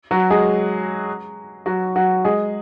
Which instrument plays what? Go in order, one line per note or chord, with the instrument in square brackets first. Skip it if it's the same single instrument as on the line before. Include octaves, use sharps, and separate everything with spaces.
[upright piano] F#3 F#4
G#3 G#4
F#3 F#4
F#3 F#4
G#3 G#4